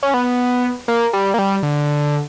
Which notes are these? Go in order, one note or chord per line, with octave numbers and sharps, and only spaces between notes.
C#4
B3
A#3
G3
A#3
G3
D3